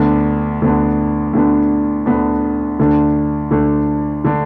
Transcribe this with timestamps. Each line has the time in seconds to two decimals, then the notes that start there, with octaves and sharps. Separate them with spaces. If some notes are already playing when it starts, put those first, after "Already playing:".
Already playing: D2 D3 B3 D4
0.62 D2 D3 B3 D4
1.33 D2 D3 B3 D4
2.06 D2 D3 B3 D4
2.79 D2 D3 A3 D4
3.51 D2 D3 A3 D4
4.25 D3 A3 D4